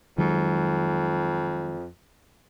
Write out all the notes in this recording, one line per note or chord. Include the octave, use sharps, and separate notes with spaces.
F2 D#3 F#3 G#3